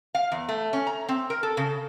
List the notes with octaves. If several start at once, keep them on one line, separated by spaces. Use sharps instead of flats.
F5
E2
A3
C#4
A#5
C4
A#4
A4
C#3